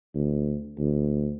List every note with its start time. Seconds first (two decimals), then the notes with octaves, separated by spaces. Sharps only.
0.15 D2
0.79 D2